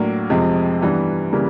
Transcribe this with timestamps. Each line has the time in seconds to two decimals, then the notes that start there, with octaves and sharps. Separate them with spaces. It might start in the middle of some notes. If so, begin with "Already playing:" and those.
Already playing: A2 F#3 A#3 D4
0.30 F2 C3 F3 G#3 C4
0.82 G2 E3 G3 B3 D4
1.32 C#3 E3 G3 A#3